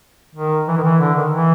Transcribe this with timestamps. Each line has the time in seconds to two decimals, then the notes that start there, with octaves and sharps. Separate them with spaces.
0.36 D#3
0.68 E3
0.77 D#3
0.84 E3
1.01 D3
1.16 D#3
1.33 E3